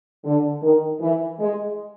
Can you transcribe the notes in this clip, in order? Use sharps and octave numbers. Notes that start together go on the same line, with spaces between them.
D3
D#3
E3
G#3